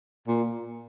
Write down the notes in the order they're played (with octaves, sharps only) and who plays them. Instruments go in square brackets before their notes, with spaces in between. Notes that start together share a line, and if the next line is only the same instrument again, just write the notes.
[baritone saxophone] A#2